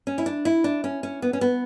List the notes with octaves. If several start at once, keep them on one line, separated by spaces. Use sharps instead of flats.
C#4
E4
D4
E4
D4
C#4
C#4
B3
C#4
B3